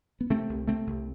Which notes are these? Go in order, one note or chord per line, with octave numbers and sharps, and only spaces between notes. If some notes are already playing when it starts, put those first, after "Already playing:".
B3
C3 A3 C4
C2
C3 A3 C4
C2